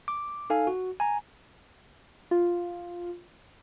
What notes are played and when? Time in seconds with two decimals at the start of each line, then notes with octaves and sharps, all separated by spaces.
0.08 D6
0.50 D#4 A4 F5 G#5
0.67 F#4
1.00 G#5 A#5
2.31 F4